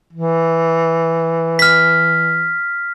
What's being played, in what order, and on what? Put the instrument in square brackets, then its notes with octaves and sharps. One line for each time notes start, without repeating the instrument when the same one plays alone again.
[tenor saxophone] E3
[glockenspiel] F6 B6